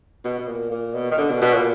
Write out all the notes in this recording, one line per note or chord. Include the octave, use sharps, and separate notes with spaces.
B2
B2
A#2
A#2
B2
D#3
D3
B2
B2
A#2